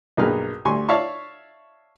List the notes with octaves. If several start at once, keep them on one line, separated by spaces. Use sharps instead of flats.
B1 G2 A#3 G#4 B4 F6
D2 G3 G#5 C6 C#6
C#5 D5 E5 F5 A5 C#6